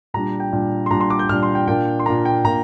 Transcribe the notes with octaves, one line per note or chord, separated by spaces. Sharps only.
A#2 G3 D4 A#5
G5
A#2 G3 D4
C6
A#2 G3 D4 A#5
C6
D6
G6
A#2 G3 D4 F6
C6
G5
A#2 A#3 D4 G5
C6
A#2 A#3 D4 A#5
G5
A#2 A#3 A#5